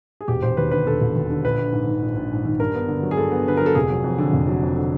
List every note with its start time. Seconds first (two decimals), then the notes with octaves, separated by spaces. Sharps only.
0.21 G#4
0.28 E1 G4
0.42 E1 C5
0.57 D#2 B4
0.71 D3 B4
0.86 E1 A4
1.01 E1
1.16 D#2
1.30 D3
1.44 A#1 B4
1.58 A#1
1.73 G#2
1.87 D#3
2.02 A#1
2.16 A#1
2.32 G#2
2.45 D#3
2.59 G2 A#4
2.75 B3
2.88 D3
3.03 F#3
3.11 G#4
3.17 G2 A4
3.32 B3
3.47 D3 B4
3.57 F#3 A#4
3.66 A4
3.75 F1 G#4
3.90 F#3
4.04 F2
4.18 D3
4.33 F1
4.48 F#3
4.63 F2
4.76 D3